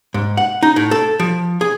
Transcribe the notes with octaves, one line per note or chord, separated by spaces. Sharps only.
G#2
F#5
D#4
A2
A4
F3
G#4